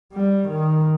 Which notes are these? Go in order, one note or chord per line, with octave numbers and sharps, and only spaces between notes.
G3
D#3